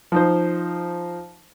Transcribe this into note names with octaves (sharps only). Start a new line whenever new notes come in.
F3 D#4 C5